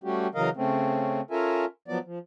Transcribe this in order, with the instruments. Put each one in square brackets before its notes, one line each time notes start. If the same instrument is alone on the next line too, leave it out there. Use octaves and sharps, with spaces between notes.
[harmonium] G3 A3 C#4 F#4 G4
C#3 E3 F#3 A#4 D#5 F5
C#3 A3 C4 C#4
C#4 F4 A4 A#4 E5 G#5
F3 F#3 B3 D5
F3